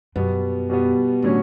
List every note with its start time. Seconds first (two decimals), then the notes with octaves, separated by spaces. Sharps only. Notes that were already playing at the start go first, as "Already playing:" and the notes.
0.16 F#2 B2 G3 B3
0.70 B2 G3 B3
1.22 A2 D3 F#3 C#4